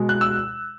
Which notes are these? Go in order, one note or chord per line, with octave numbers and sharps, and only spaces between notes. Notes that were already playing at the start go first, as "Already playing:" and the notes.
Already playing: B2 G#3
F#6
E6